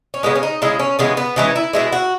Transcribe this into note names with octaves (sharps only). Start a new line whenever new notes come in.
C#4
C#3 G#3 B3
C#4
D#4
C#3 G#3 E4
C#4
C#3 E3 G#3 B3
B3
C#3 E3 G#3 D#4
E4
B2 G#3 E4
F#4